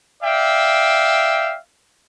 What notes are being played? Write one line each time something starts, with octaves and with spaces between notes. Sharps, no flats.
D5 E5 F5 G5